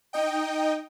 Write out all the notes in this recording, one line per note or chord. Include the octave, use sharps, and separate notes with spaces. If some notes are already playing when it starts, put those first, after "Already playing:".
D#4 D#5 G5